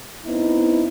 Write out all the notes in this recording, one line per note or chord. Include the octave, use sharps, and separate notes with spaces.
B3 C4 D#4 E4